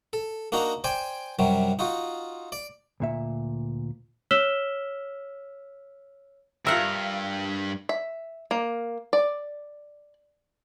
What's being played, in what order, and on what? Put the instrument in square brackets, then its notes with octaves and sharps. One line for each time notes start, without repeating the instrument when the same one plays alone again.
[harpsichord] A4
A#3 D4 D#4 F#4 A#5
C5 D5 G5 G#5
F#2 C3 F#3 G3
D#4 F4 F#4
D5
[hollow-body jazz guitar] D2 A#2 E5
[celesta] C#5 E6 F6 B6 E7 G7
[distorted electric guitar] G2 [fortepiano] F4 E5 [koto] A#4 F#5
[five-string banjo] E5
A#3
D5